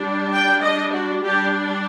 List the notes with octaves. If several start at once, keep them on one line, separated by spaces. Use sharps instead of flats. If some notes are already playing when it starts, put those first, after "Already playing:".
Already playing: G3 D4
G5
D#5
F#4
G3 D4 G4